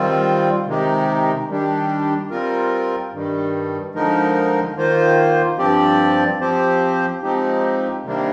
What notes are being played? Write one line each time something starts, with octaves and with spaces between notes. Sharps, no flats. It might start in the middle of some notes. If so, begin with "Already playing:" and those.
Already playing: D#3 G3 C4 F4
C3 D#3 G#3 D#4 G4
D#3 G3 D4 G4
G3 C4 F4 A#4
G2 D#3 G3
D3 F3 G#3 D#4 A#4
D#3 A#3 F4 C5
G2 F3 C4 G4 D5
F3 C4 G4 C5
F3 G#3 C4 D#4 G4
C3 D#3 G3 A#3 D4